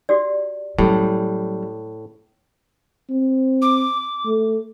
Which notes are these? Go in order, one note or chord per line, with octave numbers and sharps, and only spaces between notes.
F#4 G4 D5
A2 F#3 G3 C#4
C4
D6
A3